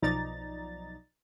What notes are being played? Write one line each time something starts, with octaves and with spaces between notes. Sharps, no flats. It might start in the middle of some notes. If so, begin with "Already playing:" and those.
B1 F3 D#4 D5 A#5 A6